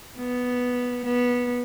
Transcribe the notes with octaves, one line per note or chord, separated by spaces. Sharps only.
B3
B3